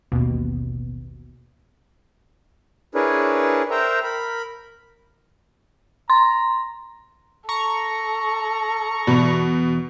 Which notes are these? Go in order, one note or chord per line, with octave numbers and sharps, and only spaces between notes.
A1 D#2 B2
D4 E4 G#4 A#4 B4 C#5
A#4 C5 E5 G5 A#5
A#4 B5
A#5 C6
A4 A#5 C#6
E2 B2 D5 B5